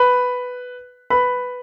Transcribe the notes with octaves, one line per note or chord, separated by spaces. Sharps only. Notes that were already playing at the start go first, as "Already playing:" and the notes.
Already playing: B4 B5
B4 B5